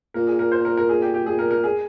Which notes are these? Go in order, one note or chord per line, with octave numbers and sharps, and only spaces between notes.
A#2 A#4
G#4
A#4
C5
A#4
A#4
G#4
G4
G4
A#2 G#4
A#4
A#4
G#4